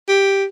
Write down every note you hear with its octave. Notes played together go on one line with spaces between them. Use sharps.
G4